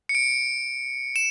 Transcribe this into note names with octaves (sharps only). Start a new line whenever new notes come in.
C#7
D7
E7